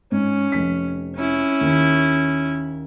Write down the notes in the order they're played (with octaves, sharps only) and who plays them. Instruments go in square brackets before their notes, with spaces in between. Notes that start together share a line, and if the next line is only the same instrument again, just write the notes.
[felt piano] G#2 [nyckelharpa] C#4
[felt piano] F1 B6
[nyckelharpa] C#4 E4
[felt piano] D#2